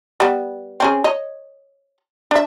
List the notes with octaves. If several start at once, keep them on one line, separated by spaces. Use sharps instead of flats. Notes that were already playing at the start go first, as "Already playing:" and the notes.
G3 B3
C4 C#4 G#4
C#5 D#5
D4 E5